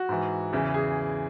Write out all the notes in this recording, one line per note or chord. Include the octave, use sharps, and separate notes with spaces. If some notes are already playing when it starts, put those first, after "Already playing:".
Already playing: F#4
G#2 E3
E2 C#3 E3
G#4